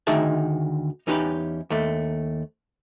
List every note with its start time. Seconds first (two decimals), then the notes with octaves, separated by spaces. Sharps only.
0.07 D2 D#3 D#4 G#4 E5 A5
1.07 E2 C#4 D#4 G4 B4
1.70 D#2 A3